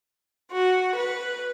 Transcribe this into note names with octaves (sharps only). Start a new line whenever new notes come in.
F#4
B4